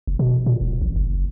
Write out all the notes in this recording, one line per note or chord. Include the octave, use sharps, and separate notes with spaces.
F1
B2
A#2
E1
A1
F#1